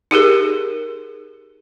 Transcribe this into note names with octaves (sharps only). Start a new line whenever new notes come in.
D#4 G4 G#4 A#4